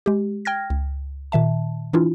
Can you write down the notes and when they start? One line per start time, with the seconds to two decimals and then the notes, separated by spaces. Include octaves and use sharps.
0.06 G#3 G4
0.45 G5 F6 G#6 A#6
0.70 C#2
1.32 A#2 D#3 E5 A5
1.93 E3 D4 E4 F4